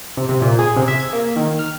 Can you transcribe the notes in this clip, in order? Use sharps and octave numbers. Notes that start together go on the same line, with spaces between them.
C3
C3
A#2
G#4
C3
E5
G#6
A#3
D#3
F6